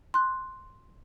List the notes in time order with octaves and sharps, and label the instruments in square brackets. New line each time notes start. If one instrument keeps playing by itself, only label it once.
[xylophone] C6 F#6